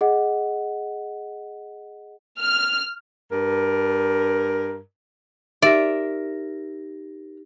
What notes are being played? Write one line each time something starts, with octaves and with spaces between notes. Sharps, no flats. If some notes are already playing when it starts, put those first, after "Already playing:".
G#4 D#5 F#5
F6
G2 A#4
D#4 G4 A#4 D5 E5 A#6